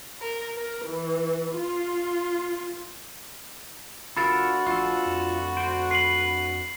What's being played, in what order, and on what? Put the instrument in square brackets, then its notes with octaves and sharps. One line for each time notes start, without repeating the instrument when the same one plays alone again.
[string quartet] A#4
A#4
E3
F4
[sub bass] F1 [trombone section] D2 F#4 [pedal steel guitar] F4 A4 A#4 [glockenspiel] B5 A6
[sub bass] A#1 [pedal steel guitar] F4 A4
[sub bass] F2
[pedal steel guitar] C5 [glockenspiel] D7
[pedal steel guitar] B4 [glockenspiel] C7 F#7